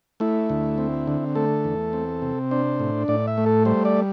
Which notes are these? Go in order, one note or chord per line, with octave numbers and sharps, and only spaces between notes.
A3 E4
D2
C4
D3
A3 A4
E2
C4
C3
D4 C5
A2
A2 D5
E5
A3
A4
G3 C5
D5